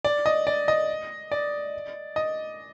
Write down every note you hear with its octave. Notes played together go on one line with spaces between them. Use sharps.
D5
D#5
D5
D#5
D5
D#5